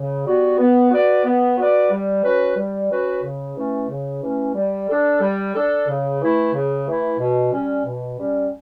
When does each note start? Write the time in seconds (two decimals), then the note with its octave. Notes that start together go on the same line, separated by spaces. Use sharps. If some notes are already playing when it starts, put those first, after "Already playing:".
Already playing: C#3
0.26 G3 B3 F#4
0.58 B3
0.91 F#4 B4 D5
1.25 B3
1.57 F#4 B4 D5
1.91 G3
2.24 C#4 F#4 B4
2.57 G3
2.91 C#4 F#4 B4
3.24 C#3
3.56 E3 A3 C#4
3.89 C#3
4.22 E3 A3 C#4
4.55 G3
4.89 D4 A4
5.21 G3
5.55 D4 A4
5.87 C#3
6.21 E3 A3 E4
6.54 C#3
6.87 E3 A3 E4
7.19 B2
7.53 G3 C#4
7.85 B2
8.19 G3 C#4